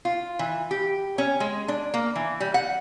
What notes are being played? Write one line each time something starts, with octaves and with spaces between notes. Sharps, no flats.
F4
E3
G4
C#4
G#3
D4
A#3
E3
G3
F#5